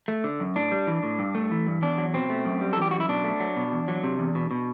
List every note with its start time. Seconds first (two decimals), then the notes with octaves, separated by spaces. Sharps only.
0.08 A3
0.24 D3
0.40 F#2
0.56 A2 D4
0.72 G3
0.87 E3
1.03 A2
1.19 G2
1.35 A3
1.51 E3
1.66 G2
1.82 E2 D4
1.98 F#3
2.14 B2 C4
2.30 A3
2.45 F#2
2.61 G3
2.73 A4
2.77 E3 G4
2.91 F#2 F#4
3.00 E4
3.09 B2 D4
3.24 A3
3.40 F#3
3.56 B2
3.72 E2
3.88 F#3
4.03 C3
4.19 E2
4.35 B2
4.51 B2